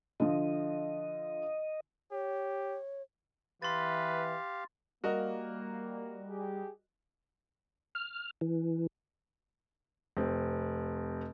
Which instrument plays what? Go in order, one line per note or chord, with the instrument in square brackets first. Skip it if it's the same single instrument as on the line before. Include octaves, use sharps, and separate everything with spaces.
[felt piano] D3 F3 [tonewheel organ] D#5
[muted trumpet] G4 [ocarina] C#5
[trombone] E3 [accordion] G4 F5 [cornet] B4 [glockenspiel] C6 A6
[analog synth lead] G3 [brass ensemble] A#3 [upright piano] F#4 A#4 D#5
[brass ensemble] G4 G#4
[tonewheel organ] F6
E3
[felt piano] F1 C4